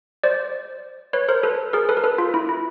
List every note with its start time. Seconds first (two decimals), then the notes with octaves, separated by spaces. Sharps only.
0.23 C5 D5
1.13 B4 C#5
1.29 A#4 C5
1.43 A4 B4
1.73 G#4 A#4
1.89 A4 B4
1.97 A#4
2.04 A4 B4
2.18 F4
2.34 E4
2.49 E4